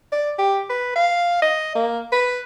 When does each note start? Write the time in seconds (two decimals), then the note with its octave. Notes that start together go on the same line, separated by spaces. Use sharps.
0.12 D5
0.38 G4
0.70 B4
0.95 F5
1.42 D#5
1.75 A#3
2.12 B4